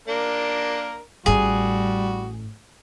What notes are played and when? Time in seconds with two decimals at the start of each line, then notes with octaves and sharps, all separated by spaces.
0.08 A#3 D4 A#4
1.26 A1 A2 G3 F#4 G#4